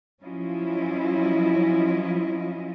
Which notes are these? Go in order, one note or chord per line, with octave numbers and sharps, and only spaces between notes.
F3 F#3 C#4 E4 F4 D#5